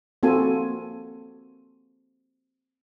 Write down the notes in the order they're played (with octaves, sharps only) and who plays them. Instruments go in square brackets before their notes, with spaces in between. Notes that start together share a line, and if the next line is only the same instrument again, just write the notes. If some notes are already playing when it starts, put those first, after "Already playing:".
[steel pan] A#3 C4 F4 F#4 A4 G#5